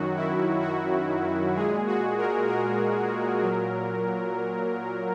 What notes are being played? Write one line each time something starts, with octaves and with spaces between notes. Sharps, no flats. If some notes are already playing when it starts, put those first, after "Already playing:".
Already playing: F#2 D#3 F#3 F#4
E4
F#4
A#2 G#3 G#4
F#4
A#4
A#4
A#2 F#3